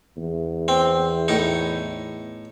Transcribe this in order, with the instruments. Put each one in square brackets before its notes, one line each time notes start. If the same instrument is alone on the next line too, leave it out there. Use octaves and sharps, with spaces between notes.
[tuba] E2
[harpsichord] C4
A2 D#4